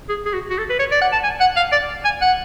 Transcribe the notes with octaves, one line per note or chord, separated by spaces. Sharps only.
G#4
G#4
F#4
F#4
A4
B4
C#5
D5
F#5
A5
G#5
F#5
F5
D5
G#5
F#5